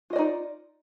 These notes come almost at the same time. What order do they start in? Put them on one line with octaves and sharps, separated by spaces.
F4 D#5 D5 D#4